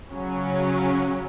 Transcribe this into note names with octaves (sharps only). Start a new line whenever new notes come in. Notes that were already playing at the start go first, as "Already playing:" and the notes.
C#3 F#3 C#4